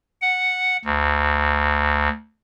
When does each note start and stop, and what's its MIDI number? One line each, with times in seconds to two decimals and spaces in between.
0.22 0.77 78
0.85 2.09 38